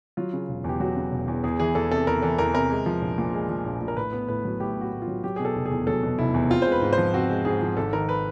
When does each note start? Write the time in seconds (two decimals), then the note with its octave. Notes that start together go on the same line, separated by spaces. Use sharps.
0.17 F#3 F4
0.33 C#3
0.49 E1
0.64 E2 G4
0.80 F#3 F#4
0.96 C#3
1.12 E1
1.28 E2
1.44 E2 G#4
1.60 E3 G#4
1.75 E2 A4
1.91 C3 A4
2.07 E2 A#4
2.22 E3 A4
2.38 E2 A#4
2.54 C3 A#4
2.70 G#3
2.86 F3
3.02 A#1
3.18 A#2
3.34 G#3
3.49 F3
3.65 A#1
3.81 A#2
3.88 A#4
3.97 A2 B4
4.13 B3
4.28 A2 B4
4.45 F#3
4.60 A2 G4
4.76 B3
4.81 F#4
4.92 A2
5.02 F4
5.07 F#3
5.24 F#3 G4
5.36 B2 G#4
5.45 A4
5.55 F1
5.66 G#4
5.71 E2
5.87 F#3 A4
6.03 B2
6.19 F1 E4
6.34 E2
6.50 C4 F4
6.62 G#3 C5
6.72 B4
6.82 G#2
6.93 C5
6.98 F3
7.14 C4 F#4
7.30 G#3
7.45 G#2 G#4
7.61 F3
7.77 G#1 A4
7.93 D#3 A#4
8.09 B4